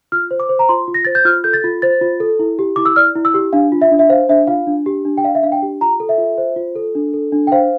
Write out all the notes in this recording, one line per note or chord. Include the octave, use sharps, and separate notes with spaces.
F4 F6
C5
D6
C5
A#5
F4 C6
F4
A#6
C5 A6
G6
F4 F6
A4 G6
A6
F4
C5 A6
F4
A4
E4
G4
E4 D6
E6
D5 F6
E4
E6
G4
D4 F5
F4
E5
D4
E5
C5 F5
D4 E5
F4 F5
D4
G4
D4
G5
D5 F5
E5
D4 F5
G5
G4
F4 A#5
A4
E5
F4
C5
F4
A4
D4
A4
D4
G5
C5 F5